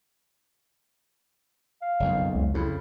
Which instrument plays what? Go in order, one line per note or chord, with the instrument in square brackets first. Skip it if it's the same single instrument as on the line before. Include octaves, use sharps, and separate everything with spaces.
[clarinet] F5
[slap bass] F#1 B1 F2
[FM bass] C#2
[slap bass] F2 C#3 [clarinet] E4